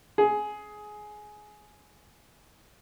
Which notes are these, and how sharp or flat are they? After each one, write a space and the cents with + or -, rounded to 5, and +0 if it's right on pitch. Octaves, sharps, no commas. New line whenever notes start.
G#4 +15